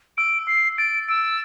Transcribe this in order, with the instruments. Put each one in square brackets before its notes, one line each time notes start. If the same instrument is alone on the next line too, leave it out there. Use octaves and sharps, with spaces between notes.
[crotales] E6 [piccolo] D7
[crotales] E6 [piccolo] C7
[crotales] A6 [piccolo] D7
[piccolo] E6 [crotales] D7